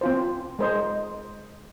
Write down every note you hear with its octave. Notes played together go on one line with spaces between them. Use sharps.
C4 F4 C5
G#3 C5 D#5